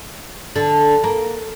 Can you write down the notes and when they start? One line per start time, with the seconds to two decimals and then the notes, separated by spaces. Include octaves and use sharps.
0.56 D3
1.04 A#3